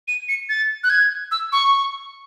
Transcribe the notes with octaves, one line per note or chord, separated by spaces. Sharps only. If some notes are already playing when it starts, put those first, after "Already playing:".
D#7
C#7
A6
F#6
G#6
E6
C#6